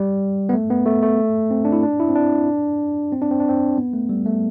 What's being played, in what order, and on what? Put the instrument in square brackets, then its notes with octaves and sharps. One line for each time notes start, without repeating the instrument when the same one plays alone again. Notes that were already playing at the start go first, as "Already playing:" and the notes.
Already playing: [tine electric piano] G3
B3
A3
B3
A3
A3
C4
D4
E4
D4
E4
C4
D4
C4
D4
C4
D4
C4
B3
A3
G3
A3